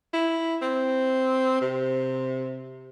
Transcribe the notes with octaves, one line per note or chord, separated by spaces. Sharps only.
E4
C4
C3